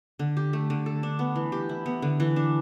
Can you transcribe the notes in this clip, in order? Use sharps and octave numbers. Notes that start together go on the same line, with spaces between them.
D3
G4
A3
D3
A4
D4
B3
E3
G4
E4
B3
D3
E3
D4